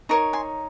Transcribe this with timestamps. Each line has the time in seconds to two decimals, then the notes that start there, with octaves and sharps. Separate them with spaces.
0.09 D#4 A#4 C#5 A#5 C#6
0.33 G#5 C6